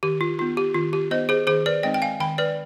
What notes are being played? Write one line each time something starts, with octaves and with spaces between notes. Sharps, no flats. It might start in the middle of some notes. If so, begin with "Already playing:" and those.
D#3 G4
F4
B3 D#4 F4
G4
D#3 F4
G4
B3 D#4 C5 D#5
G#4 C5
D#3 G#4 C5
B4 D5
G#3 C4 D#4 D#5 G5
G5
F5 G#5
D#3 G5 B5
B4 D5